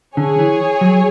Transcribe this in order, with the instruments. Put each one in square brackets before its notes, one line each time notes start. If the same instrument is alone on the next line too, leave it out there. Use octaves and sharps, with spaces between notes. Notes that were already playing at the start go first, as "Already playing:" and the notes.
[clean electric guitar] D3 [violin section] G#4 C#5 G#5
[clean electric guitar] E3
F#3